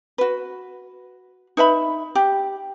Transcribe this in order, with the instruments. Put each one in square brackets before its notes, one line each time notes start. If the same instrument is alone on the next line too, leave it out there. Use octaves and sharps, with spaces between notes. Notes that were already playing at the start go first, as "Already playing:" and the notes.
[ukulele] F#4 B4
D#4 B4 E5 B5
G4